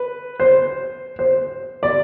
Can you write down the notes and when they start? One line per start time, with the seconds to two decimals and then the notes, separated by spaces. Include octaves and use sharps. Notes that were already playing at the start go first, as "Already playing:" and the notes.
Already playing: B4
0.40 C5
1.19 C5
1.83 D5